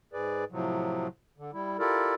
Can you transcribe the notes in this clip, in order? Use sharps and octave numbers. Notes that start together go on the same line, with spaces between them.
G#2 G#4 B4 D5
A2 C3 F3 F#3
D3
G3 E4
E4 F4 G4 A4 A#4 D5